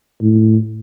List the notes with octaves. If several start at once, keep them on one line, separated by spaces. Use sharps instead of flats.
A2